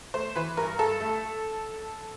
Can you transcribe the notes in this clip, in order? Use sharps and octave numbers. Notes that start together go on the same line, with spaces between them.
A3 C5
E3 B4
G2 A#4
G2 A4
A3